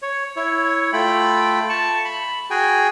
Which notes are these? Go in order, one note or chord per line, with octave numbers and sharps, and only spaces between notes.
C#5
E4 C#5
A3 F4 G5 B5
A5 C#6
B5
F#4 G#4 G5 G#5